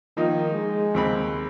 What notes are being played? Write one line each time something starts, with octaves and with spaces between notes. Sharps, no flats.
D#3 F3 A#3 D#4
G#3
D#2 C4 B5